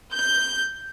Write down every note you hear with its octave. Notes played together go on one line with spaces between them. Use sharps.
G6